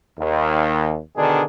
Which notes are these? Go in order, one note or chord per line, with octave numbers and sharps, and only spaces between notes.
D#2
B2 D3 D#3 D4 G#4